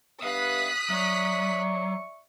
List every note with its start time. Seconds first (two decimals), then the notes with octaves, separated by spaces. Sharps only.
0.23 G2 B3 E5 F5 D#6 F#6 B6
0.90 F#3 D5 E5 C#6